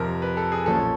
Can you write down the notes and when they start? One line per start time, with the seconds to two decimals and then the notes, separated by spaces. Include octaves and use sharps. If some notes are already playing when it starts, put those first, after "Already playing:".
Already playing: F2 C3 F3 A#4
0.22 B4
0.37 A4
0.52 G#4
0.66 B1 A#2 F3 A#3 C#4 A4